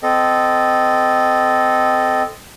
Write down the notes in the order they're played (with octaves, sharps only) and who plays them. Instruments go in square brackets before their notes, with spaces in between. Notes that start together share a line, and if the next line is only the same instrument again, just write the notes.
[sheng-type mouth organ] C4 A4 D#5